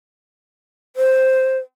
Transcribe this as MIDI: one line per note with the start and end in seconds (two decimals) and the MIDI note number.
0.96 1.58 72